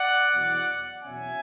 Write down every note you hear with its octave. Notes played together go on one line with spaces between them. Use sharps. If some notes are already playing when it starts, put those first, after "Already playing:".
Already playing: D5 F#5
E2 B2 F#3
E2 B2 F#3 C#4 E5 G#5